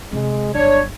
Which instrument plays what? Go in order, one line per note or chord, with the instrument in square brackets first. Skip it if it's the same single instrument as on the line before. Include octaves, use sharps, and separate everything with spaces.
[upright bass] C3 C4 [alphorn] G#3
[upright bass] G1 F#2 [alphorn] D4 [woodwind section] C#5